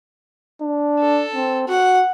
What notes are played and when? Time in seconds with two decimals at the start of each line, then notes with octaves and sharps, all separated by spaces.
0.62 D4
0.99 A4
1.34 C4
1.68 F#4 F#5